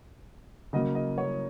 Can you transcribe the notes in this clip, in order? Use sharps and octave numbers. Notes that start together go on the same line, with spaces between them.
C#3 F#3 A#3 D#5
D#5
C#5